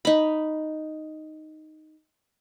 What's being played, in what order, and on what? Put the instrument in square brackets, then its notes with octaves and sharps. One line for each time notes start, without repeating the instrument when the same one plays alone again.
[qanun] D#4 B5